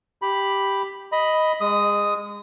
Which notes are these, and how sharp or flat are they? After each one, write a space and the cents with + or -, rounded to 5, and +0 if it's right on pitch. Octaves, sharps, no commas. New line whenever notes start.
G4 +0 B5 +0
D#5 +5 B5 +0
G#3 -25 D#6 +0